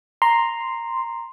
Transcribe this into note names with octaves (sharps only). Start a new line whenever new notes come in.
A#5 C6